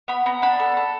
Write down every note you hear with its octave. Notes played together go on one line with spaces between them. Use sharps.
B3 B5
B3 A#5
D4 B5
A4
A4